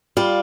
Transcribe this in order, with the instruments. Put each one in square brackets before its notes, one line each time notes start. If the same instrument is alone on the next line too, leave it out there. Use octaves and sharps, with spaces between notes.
[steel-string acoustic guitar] G3 [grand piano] F4 F5